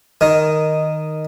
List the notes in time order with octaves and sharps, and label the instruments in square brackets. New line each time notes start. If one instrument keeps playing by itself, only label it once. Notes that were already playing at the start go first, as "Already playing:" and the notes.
[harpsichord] D#3